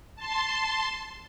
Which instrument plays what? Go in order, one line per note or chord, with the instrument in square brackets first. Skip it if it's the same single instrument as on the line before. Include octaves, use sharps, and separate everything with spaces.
[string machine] A5 C6